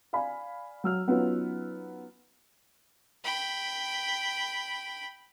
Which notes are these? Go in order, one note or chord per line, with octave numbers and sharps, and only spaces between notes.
D5 F5 G#5 B5
F#3 E6 F6
F#3 B3 C#4 D#4 F4 B4
G5 B5